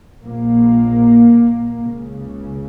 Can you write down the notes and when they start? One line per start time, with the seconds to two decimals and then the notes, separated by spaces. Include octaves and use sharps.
0.25 A#1 A#2 A#3
1.81 C#2 C#3